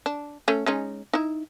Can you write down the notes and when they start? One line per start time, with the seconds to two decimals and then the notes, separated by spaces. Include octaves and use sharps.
0.06 D4
0.48 A3 C#4
0.66 G#3 C#4 D#4
1.13 D#4 E4